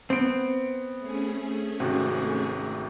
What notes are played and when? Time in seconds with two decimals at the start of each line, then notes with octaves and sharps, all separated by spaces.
0.10 B3 C4 D7
0.99 A3 C#4 G#4
1.80 G#1 C3 F#4